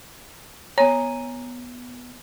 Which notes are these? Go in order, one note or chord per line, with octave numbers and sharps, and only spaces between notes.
B3 C#5 G#5 A#5